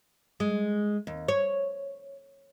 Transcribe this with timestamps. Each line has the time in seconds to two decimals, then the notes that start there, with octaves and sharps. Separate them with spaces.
0.40 G#3
1.07 D#2
1.28 C#5